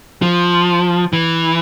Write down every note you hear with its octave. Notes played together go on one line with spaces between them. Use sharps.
F3
E3